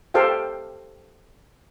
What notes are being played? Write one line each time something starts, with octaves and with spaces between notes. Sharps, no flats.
G4 A4 C5 F5 G5